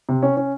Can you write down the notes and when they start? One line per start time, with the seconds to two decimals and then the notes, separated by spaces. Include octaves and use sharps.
0.09 C3
0.23 C#4
0.37 C#4